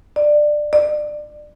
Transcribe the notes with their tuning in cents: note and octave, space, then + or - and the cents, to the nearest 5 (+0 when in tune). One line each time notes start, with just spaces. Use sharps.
D5 +15
D5 +25